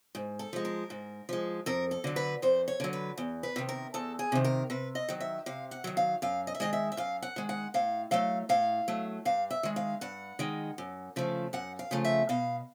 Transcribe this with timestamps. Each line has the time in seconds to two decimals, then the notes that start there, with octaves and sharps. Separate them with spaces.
0.15 G#2
0.39 A4
0.53 F3 G#3
0.65 A#4
0.90 G#2
1.29 F3 G#3
1.66 F2 A#4
1.91 A4
2.04 D3 F#3
2.16 B4
2.42 F2 C5
2.68 C#5
2.80 D3 F#3
2.93 B4
3.17 E2
3.43 B4
3.56 C3 D#3
3.69 A#4
3.94 E2 A4
4.19 G#4
4.32 C3 D#3
4.45 A#4
4.70 C3 B4
4.95 D#5
5.08 D#3 F#3
5.20 E5
5.46 C3 F5
5.71 F#5
5.84 D#3 F#3
5.97 F5
6.22 F#2 F5
6.47 D#5
6.55 E5
6.60 D#3 G#3 D#5
6.73 E5
6.92 E5
6.97 F#2 F5
7.22 F#5
7.36 D#3 G#3
7.49 F#5
7.74 A2 F5
8.11 F#3 A3 F5
8.49 A2 F5
8.88 F#3 A3
9.25 G2 F5
9.50 E5
9.63 D#3 G#3
9.76 F5
10.01 G2 F#5
10.39 D#3 G#3
10.78 F#2
11.16 C#3 F3 A3
11.53 F#2 F#5
11.79 F5
11.91 C#3 F3 A3
12.05 E5
12.29 B2 F5